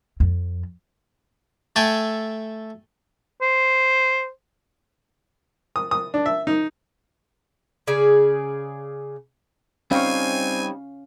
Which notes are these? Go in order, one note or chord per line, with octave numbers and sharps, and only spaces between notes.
F2
A3 A4 G5 G#5
C5
D#6
D#6
D4
E5
D#4
C#3 G#4 D5
G3 C4 C#4 D#4 C#5 F5 G#5